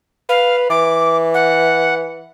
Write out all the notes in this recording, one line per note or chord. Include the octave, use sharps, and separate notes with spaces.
B4 F5
E3 D6
F#5